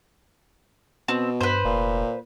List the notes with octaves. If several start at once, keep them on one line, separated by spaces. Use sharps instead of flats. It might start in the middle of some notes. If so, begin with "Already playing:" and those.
B2 C4
G2 B4 C5
F1 A#2